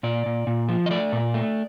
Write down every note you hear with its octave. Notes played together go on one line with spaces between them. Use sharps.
A#2 D5
A#2
A#2
F3
D#5
A3 D5
A#2
A3